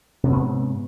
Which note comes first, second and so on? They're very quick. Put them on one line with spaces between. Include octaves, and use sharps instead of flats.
C3 C#4 B3 G#2